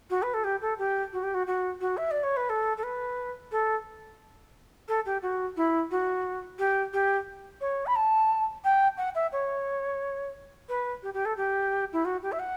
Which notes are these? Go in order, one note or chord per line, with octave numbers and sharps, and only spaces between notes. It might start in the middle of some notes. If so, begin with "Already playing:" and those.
F#4
B4
A4
G4
A4
G4
F#4
G4
F#4
F#4
F#4
E5
D5
C#5
B4
A4
A4
B4
A4
A4
G4
F#4
E4
F#4
G4
G4
C#5
B5
A5
G5
F#5
E5
C#5
B4
G4
G4
A4
G4
E4
F#4
G4
E5
F#5